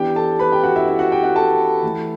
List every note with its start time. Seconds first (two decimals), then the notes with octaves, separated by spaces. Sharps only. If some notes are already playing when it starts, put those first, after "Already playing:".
Already playing: E3 B3 D4 G4 G5
0.16 A4 A5
0.39 B4 B5
0.52 G4 G5
0.63 F#4 F#5
0.76 E4 E5
0.88 E4 E5
0.99 F#4 F#5
1.12 G4 G5
1.24 F#4 F#5
1.36 A4 A5
1.83 E3 A3 E4